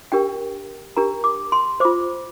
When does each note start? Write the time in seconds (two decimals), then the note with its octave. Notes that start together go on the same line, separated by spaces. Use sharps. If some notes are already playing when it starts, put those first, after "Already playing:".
0.12 D4 G4 A#4 G5
0.97 D4 G4 A#4 A#5
1.24 D6
1.52 C6
1.80 F4 C5 D6